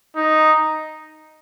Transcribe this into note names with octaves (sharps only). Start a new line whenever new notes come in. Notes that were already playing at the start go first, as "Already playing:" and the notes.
D#4